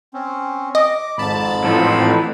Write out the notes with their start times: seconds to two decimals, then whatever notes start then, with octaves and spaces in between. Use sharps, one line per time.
0.14 C4 C#4
0.75 D#5 D6
1.18 G#1 F2 G#2 A5 B5
1.64 A2 E3 F3 C4 A4